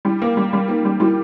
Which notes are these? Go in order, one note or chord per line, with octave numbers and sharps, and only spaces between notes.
G3 D4 E4
A#3
G3
G3
A#3 D#4 F4
G3
G3 E4 F#4